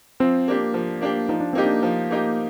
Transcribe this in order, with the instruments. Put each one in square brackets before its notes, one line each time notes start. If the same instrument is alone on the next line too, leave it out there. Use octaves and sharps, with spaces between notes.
[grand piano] F3 [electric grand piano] C4
[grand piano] A#3 D4 G4
F3
A#3 D4 G4
[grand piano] F3 [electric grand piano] D#4
[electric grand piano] D4
[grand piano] A#3 D#4 G4 [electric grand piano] C4
[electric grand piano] D4
[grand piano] F3
A#3 D#4 G4